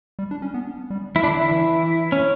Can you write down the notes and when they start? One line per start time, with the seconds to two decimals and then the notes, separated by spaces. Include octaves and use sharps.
0.19 G3
0.31 D4
0.42 C#4
0.54 B3
0.90 G3
1.15 E3 E4
1.23 D4
1.27 D3
1.31 E4
1.51 E3
2.12 C#4